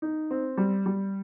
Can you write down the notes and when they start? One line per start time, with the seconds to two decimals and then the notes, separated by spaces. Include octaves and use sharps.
0.02 D#4
0.31 C4
0.57 G3
0.86 G3